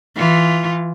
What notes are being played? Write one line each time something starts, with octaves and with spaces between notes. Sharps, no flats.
E3 F4